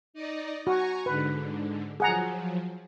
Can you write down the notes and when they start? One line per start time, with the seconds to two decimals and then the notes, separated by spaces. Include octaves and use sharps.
0.14 D#4 D5 D#5
0.67 F#4 G#5 A#5 C#6
1.06 G#2 D3 B4
2.00 F3 F#3 G#4 F#5 A#5